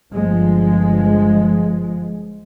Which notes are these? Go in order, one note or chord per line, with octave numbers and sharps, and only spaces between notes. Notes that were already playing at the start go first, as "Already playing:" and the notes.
G1 F3 G#3